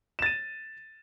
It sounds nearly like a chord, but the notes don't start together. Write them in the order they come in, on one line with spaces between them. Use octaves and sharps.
E7 A6 D#7